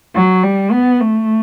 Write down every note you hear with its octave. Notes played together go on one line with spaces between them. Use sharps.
F#3
G3
B3
A3